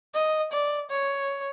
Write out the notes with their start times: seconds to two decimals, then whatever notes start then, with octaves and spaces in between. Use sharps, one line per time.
0.14 D#5
0.52 D5
0.90 C#5